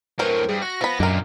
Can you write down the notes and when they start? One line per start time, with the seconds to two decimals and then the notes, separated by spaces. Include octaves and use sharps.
0.19 A2 E3 F#3 A#4 C5
0.49 G2 G#4
0.62 F#4 A#6
0.81 F3 B3 B5
1.00 F#2 A#2 D3 G#3 A#4